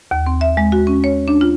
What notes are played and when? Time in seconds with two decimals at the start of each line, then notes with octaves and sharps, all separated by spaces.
0.11 D#2
0.26 C4
0.41 E5
0.57 G#3
0.72 F#4
0.87 C#4
1.04 C#5
1.28 D4
1.41 F4